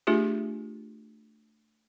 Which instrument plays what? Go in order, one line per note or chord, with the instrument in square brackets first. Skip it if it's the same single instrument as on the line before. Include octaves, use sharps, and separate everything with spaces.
[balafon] A3 D4 F4 G4 G#4